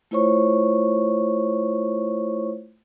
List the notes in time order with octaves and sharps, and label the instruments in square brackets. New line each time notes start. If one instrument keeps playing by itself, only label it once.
[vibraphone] A3 E4 F4 C5 C#5 C#6